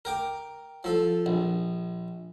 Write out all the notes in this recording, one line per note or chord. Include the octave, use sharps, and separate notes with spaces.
A#4 G5 D6
F3 A4
A#1